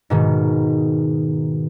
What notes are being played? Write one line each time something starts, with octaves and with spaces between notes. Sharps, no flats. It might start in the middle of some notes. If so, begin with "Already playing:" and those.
G#2 B2 D#3